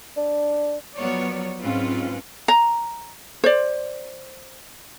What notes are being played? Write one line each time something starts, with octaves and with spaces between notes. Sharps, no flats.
D4
F3 F#3 B3 A#4 C#5 D5
G#2 F#3 C4 C#4 F4 B4
A#5
C5 D5